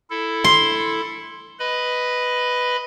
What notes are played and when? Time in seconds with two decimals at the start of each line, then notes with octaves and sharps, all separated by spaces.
0.10 E4 A4
0.44 C6
1.59 B4 D#5 B5